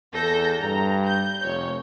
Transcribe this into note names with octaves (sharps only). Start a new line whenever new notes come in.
E2 A4 G6 A#6
G2 A#5
G6
F1 C#5